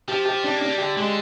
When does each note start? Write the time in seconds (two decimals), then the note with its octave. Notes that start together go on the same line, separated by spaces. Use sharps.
0.08 F3 G4
0.25 G4
0.43 G3 D4
0.55 A#3
0.61 D4
0.66 G3
0.78 D3 G4
0.96 D3 G#3